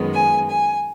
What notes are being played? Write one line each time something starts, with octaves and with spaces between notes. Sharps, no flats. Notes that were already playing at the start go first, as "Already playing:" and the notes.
Already playing: F#2 D#3 G#3 B3
G#5
G#5